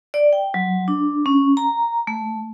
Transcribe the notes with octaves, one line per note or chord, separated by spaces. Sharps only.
D5
G5
F#3
D4
C#4
A#5
A3